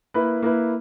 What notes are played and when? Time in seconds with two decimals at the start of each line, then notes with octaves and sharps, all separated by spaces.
0.14 A#3 E4 B4
0.42 A#3 E4 B4